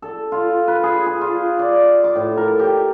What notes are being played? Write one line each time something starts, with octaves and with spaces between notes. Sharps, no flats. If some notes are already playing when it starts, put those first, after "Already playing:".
A4
F4
B4
G#4
G#4
F4
D5
D6
A2
A#4
G4